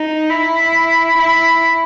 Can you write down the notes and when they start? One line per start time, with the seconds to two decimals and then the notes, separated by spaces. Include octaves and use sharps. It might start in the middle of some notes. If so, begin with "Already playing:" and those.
Already playing: D#4
0.30 E4
1.18 E4